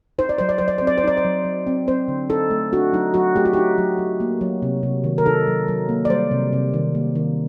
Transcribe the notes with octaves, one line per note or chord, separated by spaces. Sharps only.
D#4 C5
D5
F#3 C5
D5
F#3 C5
D5
C4 C5
D5
C5
D#4 D5
C5
F#3
F#3
C4
C4 C5
D3
D#4 A4
A3
D4 F#4
F#3 D#4
F#3 F#4
A3 G4
F#4
D#4 G4
F#3
F#3
A#3
F#3
C3
C3
D#3
A#4
D#4 A4
F#3
F#3
A#3
D5
G3 C5
C3
C3
D#3
A#3
D#3